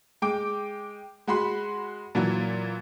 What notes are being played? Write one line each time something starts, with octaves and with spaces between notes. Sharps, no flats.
G#3 G5 D6
G#3 F#4 B5 C6
A#2 E3 F#3